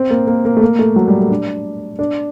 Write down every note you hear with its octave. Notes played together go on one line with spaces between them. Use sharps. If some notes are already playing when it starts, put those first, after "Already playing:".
Already playing: C4
A#3
A#3
A#3
A3
A#3
A3
F#3
G3
A3
D4
D4